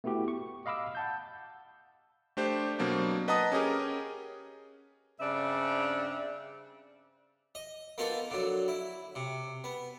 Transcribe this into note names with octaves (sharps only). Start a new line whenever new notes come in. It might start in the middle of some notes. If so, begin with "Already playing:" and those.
A3 B3 E4 F#4 G4
C#6
D#5 F5 B5 D6 E6
F#5 A5 G6
A3 D4 G4 C5
B2 F#3 A#3 C4 D4
B4 D#5 F#5 A5 A#5 D#6
C#4 G4 G#4 A#4
G2 C#3 C4 D4 D5 E5
D#5
A#3 B3 D#4 F4 A4
D3 F#3
E4
C3
B3